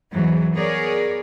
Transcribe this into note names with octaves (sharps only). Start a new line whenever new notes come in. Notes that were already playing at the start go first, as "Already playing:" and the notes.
E2 G#2 E3 F#3
B3 G#4 A#4 C#5 D5